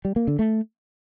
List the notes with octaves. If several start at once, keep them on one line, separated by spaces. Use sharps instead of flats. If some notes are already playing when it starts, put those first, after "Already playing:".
G3
A#3
D3
A3